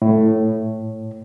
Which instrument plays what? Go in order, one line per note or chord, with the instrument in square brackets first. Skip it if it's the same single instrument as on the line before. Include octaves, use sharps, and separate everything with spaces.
[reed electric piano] A2